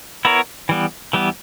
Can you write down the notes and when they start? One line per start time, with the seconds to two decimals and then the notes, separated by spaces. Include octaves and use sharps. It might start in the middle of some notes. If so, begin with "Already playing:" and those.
0.25 B3 E4 A#4 C#5
0.69 E3 G3 B3
1.13 E3 G3 B3